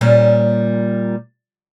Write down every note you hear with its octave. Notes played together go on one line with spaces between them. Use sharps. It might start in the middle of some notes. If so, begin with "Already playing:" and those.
A#2 G3 C#4